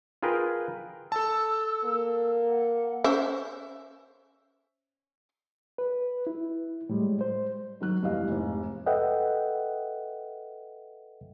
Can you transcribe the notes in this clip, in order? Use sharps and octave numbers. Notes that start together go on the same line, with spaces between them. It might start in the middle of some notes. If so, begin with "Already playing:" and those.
F4 G#4 A#4 B4 G5
A4 A5 E6
A#3
F#5
C#4 C5 E5
B4
E4
A2 G3 G#3
C5
D#3 F#3 F#6
F1 G2 E3 D#5 F5
F1 G#2
A4 B4 D#5 E5 F#5 G5